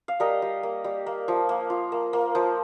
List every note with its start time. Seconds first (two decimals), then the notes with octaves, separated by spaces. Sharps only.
0.08 F5
0.20 G3 A#4 D#5
0.42 G3
0.63 A#3
0.84 G3
1.06 A#3
1.28 F3
1.49 A#3
1.70 F4
1.92 A#3
2.13 A#3
2.35 F3